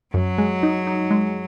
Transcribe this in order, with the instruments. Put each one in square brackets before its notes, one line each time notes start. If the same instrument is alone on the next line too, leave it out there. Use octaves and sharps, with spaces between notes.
[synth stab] F#2 [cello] F#3
[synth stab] G#3
D#4
D#4
G#3